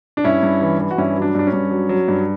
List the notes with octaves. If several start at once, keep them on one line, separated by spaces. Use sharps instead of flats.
D4
G2 C#4 E4
G2
E3
E3
F#4
G2 C#4 E4
F#3
D4
G2 D4
C#4
G2
F#3
F#3
G2